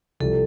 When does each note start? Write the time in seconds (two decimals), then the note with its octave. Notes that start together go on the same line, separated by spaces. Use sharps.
0.20 C2 C3 F3 A4